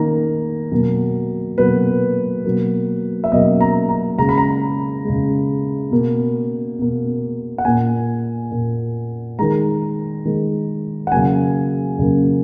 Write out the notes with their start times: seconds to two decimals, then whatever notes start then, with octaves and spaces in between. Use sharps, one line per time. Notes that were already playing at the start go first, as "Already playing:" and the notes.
Already playing: D#3 A#3 A#5
0.72 B2 F#3 A#3
1.58 B2 F#3 A#3 B4
2.45 B2 F#3 A#3
3.24 E5
3.32 B2 F#3 A#3 D#5
3.61 A#5
3.89 A#5
4.18 C#3 G#3 A#5
4.29 B5
4.38 A#5
5.05 C#3 G#3
5.92 B2 A#3
6.79 B2 A#3
7.58 F#5
7.65 A#2 A#3 G#5
8.51 A#2 A#3
9.39 D#3 G#3 A#5
10.25 D#3 G#3
11.07 F#5
11.12 C#3 F#3 A#3 G#5
11.99 C#3 F#3 A#3